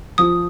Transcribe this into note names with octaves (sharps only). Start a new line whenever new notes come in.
F3 D#6